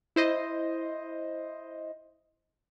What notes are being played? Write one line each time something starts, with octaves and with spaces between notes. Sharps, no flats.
E4 C5 D#5